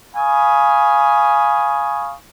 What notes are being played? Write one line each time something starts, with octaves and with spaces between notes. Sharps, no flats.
F5 G#5 B5 C#6 D#6